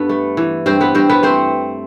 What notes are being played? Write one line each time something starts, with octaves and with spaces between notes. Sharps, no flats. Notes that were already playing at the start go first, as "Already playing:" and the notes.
Already playing: G2 B3 A4 B4
A3
E3
G2 C4 C5
B3 B4
G2 C4 C5
B3 B4
A3 C4 C5